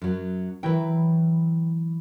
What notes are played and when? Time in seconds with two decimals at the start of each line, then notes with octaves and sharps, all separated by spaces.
0.02 F#2 F#3
0.63 E3 F#3 E4 B4 G5